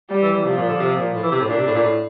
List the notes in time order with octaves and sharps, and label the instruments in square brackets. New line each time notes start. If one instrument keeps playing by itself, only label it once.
[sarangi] G3
[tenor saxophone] E3
E3
[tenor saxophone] C3 [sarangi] F3
[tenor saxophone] A#2
D3
C3
A#2
A2
E3
C3
A2
[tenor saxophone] A#2 [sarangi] D4
[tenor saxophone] C3
A2
A#2
A2